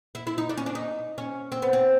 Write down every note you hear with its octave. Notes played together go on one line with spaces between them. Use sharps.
E4
E4
D#4
D4
C#4
D4
D#4
C#4
C4
B3
C4